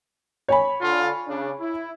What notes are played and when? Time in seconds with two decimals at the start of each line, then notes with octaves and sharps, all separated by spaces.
0.48 C#5 G#5 B5
0.82 D3 F4
1.27 C#3 D4
1.60 E4